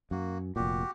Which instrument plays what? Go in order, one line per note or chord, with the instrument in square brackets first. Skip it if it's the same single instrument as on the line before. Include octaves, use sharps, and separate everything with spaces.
[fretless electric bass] F#2 [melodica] A#3 F#4
[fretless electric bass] F1 A#2 [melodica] F#4 G4